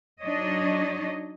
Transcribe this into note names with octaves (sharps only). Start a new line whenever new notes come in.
F#3 D4 D#4 C#5 D#5